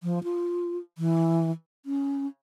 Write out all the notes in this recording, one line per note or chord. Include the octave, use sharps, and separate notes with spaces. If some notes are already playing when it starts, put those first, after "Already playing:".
F3
F4
E3
C#4